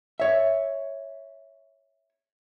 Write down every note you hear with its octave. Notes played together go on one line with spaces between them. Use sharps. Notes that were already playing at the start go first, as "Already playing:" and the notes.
C#5 E5